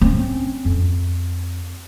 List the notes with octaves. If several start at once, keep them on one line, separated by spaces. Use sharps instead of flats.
C4 C#4
F2